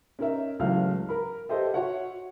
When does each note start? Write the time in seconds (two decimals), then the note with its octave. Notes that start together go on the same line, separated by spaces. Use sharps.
0.19 C#4 D#4 A#4 E5
0.60 C#2 E3 F#3 A3 F5 F6
1.09 A#4 B5
1.49 G4 A4 C5 D#5 E5
1.74 F#4 C#5 E5 F#5